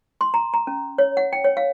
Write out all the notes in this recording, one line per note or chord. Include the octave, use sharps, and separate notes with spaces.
C6
A#5
A#5
C#4
C#5
F#5
G5
C#5
F5